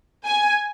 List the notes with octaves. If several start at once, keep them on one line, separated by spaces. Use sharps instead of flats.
G#5